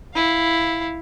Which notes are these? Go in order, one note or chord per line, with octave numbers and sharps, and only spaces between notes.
E4 F5